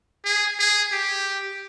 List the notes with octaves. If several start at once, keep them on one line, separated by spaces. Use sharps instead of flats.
G#4
G#4
G4